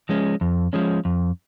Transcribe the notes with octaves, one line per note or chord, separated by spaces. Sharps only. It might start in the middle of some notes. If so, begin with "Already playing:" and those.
F3 G#3 C#4
F2
F3 G#3 C#4
F2